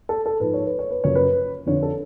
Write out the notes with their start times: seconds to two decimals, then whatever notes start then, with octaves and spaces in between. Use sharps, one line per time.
0.09 A4
0.26 A4
0.40 G#2 F3 B4
0.54 C#5
0.66 B4
0.79 C#5
0.91 B4
1.04 F#2 C#3 F3 C#5
1.15 B4
1.66 F2 D3 F3 C#5
1.83 A4